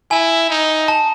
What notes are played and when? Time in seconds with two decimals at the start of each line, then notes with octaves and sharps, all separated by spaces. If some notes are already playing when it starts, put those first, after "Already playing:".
0.11 E4 G#5
0.50 D#4
0.88 A5